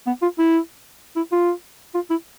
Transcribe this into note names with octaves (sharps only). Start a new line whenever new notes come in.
B3
F4
E4
E4
F4
F4
E4